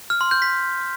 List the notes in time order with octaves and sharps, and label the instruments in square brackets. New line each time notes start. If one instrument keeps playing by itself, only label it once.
[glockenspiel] F6
C6
G6
B6